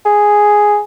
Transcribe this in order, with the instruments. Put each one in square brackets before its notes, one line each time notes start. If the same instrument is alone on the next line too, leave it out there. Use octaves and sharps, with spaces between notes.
[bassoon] G#4